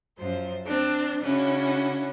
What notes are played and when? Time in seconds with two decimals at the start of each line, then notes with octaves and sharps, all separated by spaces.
0.18 F#2 F3 C5
0.63 C4 D4 A5
1.21 C#3 C#4 D4 E4 F#4